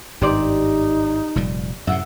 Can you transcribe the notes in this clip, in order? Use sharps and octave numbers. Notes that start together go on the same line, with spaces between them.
G#1 G2 D#4 G4 C5 D5
F1 A#2 G3
F#2 A2 C3 E5 F#5